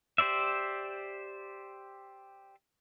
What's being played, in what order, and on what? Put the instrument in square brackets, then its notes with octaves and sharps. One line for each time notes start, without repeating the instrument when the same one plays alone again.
[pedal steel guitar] G4 C5 D5 E5